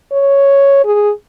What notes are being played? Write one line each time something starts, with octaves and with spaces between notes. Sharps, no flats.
C#5
G#4